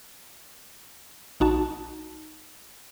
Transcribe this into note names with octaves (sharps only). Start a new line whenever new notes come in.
A#1 D#4 F#4 A5